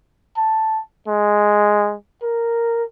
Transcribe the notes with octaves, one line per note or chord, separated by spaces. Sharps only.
A5
G#3
A#4